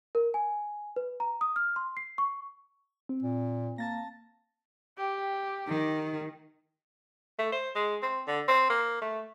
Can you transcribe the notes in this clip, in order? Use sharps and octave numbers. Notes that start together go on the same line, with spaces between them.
A#4
G#5
B4
A#5
D#6
F6
C6
C7
C#6
C4
A#2
A#3 A5 A6 A#6
G4
D#3
A3
C5
G#3
C4
D3
C4
A#3
A3